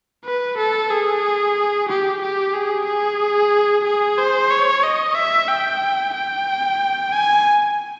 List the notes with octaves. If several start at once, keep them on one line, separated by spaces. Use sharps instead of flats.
B4
A4
G#4
G4
G4
G#4
G#4
G#4
C5
C#5
D#5
E5
G5
G5
G#5